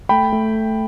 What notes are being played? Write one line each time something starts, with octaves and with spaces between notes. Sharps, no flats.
A3 G5 B5
A3